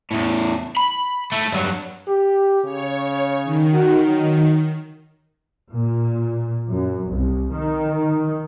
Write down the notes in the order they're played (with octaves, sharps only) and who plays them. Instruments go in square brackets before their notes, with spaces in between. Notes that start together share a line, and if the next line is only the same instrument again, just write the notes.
[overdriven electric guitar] E2 A2
B5
A3 E4
G2 F#3
[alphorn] G4
[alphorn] C#3 [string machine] C#5
[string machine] D#3
[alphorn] F#4
F#3
[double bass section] A#2
F#2
C2
D#3